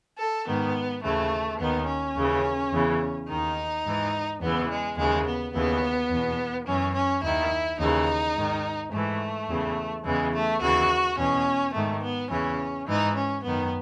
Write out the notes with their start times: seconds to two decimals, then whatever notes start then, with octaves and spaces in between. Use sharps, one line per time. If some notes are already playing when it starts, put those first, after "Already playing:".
0.19 A4
0.47 G#2 D#3 B3
1.03 D#2 C#3 E3 A3
1.60 D#2 D#3 B3
1.87 C#4
2.16 D#2 C#3 E3
2.72 E2 C#3 E3
3.29 D#2 D#3 D#4
3.84 G#2 E3
4.41 E2 C#3 E3 B3
4.69 G#3
4.98 D#2 C#3 E3 G#3
5.25 B3
5.54 D#2 C#3 E3 B3
6.10 E2 B2
6.67 F#2 E3 C#4
6.94 C#4
7.23 D#2 D#3 E4
7.79 D#2 C#3 E3 D#4
8.36 G#2 D#3
8.92 G#2 E3 A3
9.49 E2 C#3 E3
10.05 E2 C#3 E3 G#3
10.33 A3
10.61 D#2 C#3 E3 F#4
11.17 E2 B2 C#4
11.74 G#2 D#3 A3
12.02 B3
12.30 E2 C#3 E3 C#4
12.87 G#2 E3 D#4
13.14 C#4
13.43 F#2 D#3 B3